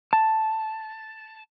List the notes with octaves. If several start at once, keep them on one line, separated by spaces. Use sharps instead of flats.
A5